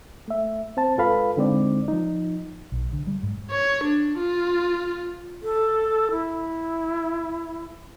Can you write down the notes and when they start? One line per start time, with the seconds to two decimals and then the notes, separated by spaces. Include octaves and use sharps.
0.28 A3 E5
0.77 C4 C5 A5
0.97 G#2 F4 A4 B4 F5 B5
1.37 D3 G#3 C4 D#4 D5
1.88 F3 D#4
2.72 B1
2.93 D3
3.07 G3
3.23 G#2
3.51 C#5
3.83 D4
4.18 F4
5.43 A4
6.11 E4